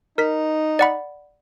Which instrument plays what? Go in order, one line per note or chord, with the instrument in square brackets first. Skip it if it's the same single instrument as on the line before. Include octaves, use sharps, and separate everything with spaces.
[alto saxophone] D#4 [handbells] A#4 B6
[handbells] D5 F#5 B5